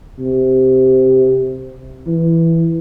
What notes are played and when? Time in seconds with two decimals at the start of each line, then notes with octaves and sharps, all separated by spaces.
0.20 C3
2.07 E3